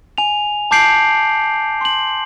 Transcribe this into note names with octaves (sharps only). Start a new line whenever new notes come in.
G#5 F7
A5 D6 G6 C7 D7 F#7
C6 F#7